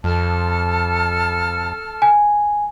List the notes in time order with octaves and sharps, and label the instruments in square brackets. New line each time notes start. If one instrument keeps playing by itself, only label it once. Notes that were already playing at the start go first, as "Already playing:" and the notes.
[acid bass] F2 [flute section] A4 A5 F6
[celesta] G#5